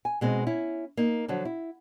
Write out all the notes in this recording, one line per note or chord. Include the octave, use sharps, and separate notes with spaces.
G#5
B2 G#3 C4 C#4 D#4
C#4 E4
A#3 D#4
D3 F3 F#3
E4